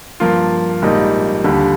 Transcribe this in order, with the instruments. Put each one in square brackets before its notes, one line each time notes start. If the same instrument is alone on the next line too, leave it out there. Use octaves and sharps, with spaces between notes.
[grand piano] G2 F3 A#3 F4
A#1 G#2 G3 A#3 D#4
D#2 D3 G3